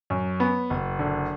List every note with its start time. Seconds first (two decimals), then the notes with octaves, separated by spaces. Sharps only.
0.10 F#2
0.40 B3
0.70 F#1
0.99 D3